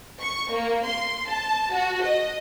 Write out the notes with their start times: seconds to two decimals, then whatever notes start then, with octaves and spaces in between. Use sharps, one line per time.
0.20 C#6
0.52 A#3
0.86 C6
1.29 A5
1.74 F#4
2.04 D#5